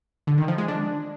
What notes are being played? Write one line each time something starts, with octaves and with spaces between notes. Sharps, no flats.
D3
D#3
F3
G#3
D4